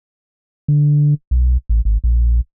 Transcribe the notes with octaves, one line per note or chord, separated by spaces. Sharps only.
D3
B1
A1
G#1
A#1